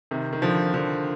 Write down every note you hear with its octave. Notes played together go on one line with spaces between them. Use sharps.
C3 D#3
D#3
D3 F3
D3 F3